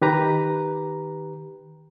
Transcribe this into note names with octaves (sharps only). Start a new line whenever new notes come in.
D#3 G4 B4 A#5